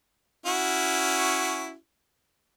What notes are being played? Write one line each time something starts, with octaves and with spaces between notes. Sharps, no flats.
C#4 E4 F#4